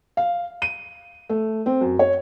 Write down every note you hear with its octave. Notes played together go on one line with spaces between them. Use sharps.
F5
D#7
A3
C4
F#2
C#5